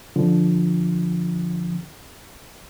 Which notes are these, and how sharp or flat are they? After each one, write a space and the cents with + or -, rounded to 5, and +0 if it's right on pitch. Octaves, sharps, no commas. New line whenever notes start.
D3 +0 F3 +0